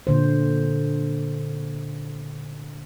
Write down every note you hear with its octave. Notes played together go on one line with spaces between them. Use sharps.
A#2 D3 C5